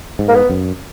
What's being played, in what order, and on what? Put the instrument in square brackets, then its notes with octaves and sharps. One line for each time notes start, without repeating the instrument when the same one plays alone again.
[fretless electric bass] G#2
[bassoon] A#3
B3
[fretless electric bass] F#2